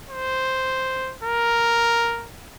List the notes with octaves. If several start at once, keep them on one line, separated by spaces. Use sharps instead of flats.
C5
A#4